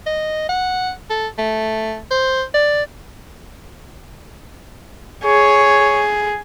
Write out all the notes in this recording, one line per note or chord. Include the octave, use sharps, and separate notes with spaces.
D#5
F#5
A4
A3
C5
D5
G#4 C#5